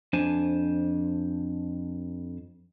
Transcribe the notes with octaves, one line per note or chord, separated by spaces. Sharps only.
F2 D4 C5 G#5 A5